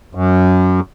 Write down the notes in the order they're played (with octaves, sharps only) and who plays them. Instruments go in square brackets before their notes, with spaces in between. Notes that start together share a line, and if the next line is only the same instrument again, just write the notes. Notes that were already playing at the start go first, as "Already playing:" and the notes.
[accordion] F#2